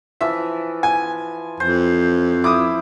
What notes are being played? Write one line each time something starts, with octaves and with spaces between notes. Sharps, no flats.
E3 F3 E5
G#5
F2 C5
E4 D6 D#6